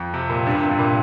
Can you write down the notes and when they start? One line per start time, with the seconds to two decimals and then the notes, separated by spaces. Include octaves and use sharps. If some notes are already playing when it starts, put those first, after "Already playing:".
Already playing: F2
0.14 C3
0.30 A#2
0.47 G2
0.55 A#2
0.63 C3
0.71 G2
0.79 A#2